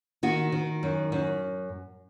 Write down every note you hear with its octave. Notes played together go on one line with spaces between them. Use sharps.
D#3 F#4
D#3
F#2
F#2